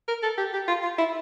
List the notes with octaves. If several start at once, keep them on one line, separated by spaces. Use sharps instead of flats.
A#4
A4
G4
G4
F4
F4
E4